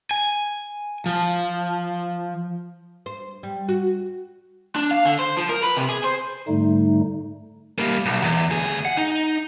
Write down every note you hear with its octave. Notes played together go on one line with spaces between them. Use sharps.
G#5
F3
C5
G3
F#4
D4
F5
D3
C5
F3
A#4
B4
C3
G#4
C5
G#2 D3 G3 A3 D#4
G3 A#3
B1
E2
D2 G#4
F#5
D#4